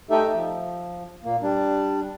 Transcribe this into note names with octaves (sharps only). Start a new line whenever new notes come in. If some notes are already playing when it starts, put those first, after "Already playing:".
A3 D#4 G4 A4 E5
F3
A#2 A#3
G3 D4